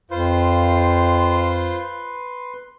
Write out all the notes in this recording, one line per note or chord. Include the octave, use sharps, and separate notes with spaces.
F2 F4 B4 C5 C6